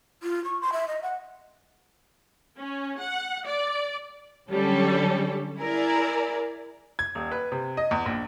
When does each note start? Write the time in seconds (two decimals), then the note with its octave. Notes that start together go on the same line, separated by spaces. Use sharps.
0.23 F4
0.44 C#6
0.61 C6
0.73 E5
0.88 D#5
1.03 F#5
2.57 C#4
2.99 F#5
3.46 D5
4.51 D3 F#3 G3 C#4 A4
5.59 E4 G#4 A#4 D5
6.99 G#6
7.15 D#1
7.31 B4
7.52 C3
7.77 D#5
7.91 E2
8.06 A#1